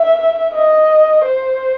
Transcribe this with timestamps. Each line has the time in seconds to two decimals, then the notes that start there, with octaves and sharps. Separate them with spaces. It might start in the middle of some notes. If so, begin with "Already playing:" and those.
Already playing: E5
0.54 D#5
1.25 C5